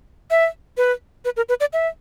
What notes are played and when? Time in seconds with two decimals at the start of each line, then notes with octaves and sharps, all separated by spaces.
0.30 E5
0.77 B4
1.25 B4
1.37 A#4
1.49 B4
1.60 D5
1.73 E5